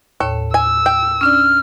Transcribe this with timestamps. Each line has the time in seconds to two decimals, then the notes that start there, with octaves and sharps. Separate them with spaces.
0.20 D#2 A2 A4 C#5
0.54 G#5 E6
0.86 G5
1.21 C#4 D4 D5 F6